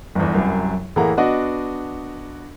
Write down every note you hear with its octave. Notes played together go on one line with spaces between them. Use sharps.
G1 E2
C2 F#2
A2 E3 A#3 G#4 F#5 A#5
B3 D4 F#4 D#5